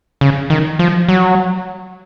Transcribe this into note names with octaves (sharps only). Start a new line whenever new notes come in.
C#3
D#3
F3
F#3